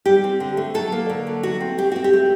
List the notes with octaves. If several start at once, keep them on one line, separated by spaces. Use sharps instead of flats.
G3 G4
C4
D3
A3
F#3 A4
A#3
D3
F#3
A3 F#4
C4
A3 G4
C4 F#4
G4
A3